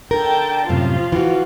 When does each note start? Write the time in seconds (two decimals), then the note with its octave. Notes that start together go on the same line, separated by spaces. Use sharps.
0.11 D3 A#4 G5 A5
0.69 F#2 A2 C3 F3 F4
1.12 E3 F#4